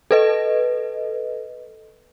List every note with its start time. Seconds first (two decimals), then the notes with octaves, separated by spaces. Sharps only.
0.11 A4 B4 D#5